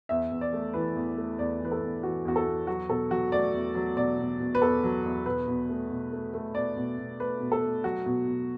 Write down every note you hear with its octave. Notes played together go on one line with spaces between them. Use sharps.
E2 E5
E2
D5
A3
E3 B4
E2
A3
E2 D5
E3 B4
A4
E2
E3 F#4
E2 F#4
A4
E2
F#3 F#4
B2 A4
F#3 F#4
A3 D5
E2
F#3
B2 D5
B2
B2
B4
E2 A4
F#3
E2
B2 B4
B2
A3
B2
A3
A3
B2 D5
B2
B2
A3 B4
B2
A4
A3
F#3 F#4
B2
B2